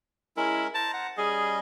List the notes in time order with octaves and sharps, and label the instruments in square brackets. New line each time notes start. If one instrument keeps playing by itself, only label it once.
[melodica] G#3 C#4 A#4 [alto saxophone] E4
[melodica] C5 A#5 [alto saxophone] A5
[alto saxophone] F#5
[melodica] G3 C#4 D#5 [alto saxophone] G#4